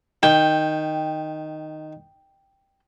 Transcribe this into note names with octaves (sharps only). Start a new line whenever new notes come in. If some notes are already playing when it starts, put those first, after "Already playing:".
D#3 G5